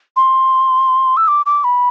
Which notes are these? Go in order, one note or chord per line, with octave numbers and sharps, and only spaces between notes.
C6
E6
D6
D6
B5